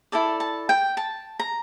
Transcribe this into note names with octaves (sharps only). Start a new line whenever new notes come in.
E4 A4 D5 A5
A5
G5
A5
A#5